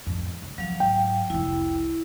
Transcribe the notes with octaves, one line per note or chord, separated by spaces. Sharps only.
F2 A2
F#2 C#3
F2 F#3 F5
G#2 G5
F1 C2 E4